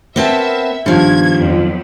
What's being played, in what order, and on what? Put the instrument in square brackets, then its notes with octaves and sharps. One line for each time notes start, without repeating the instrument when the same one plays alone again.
[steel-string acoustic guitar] B3 C4 A5 [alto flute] A#4 [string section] E5
[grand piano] G2 [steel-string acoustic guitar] D#3 F3 [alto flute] B3 [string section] G#6
[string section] F2 F#3